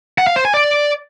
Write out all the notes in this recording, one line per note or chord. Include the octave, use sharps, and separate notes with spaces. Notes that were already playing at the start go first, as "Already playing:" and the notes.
F#5
F5
C5
G#5
D5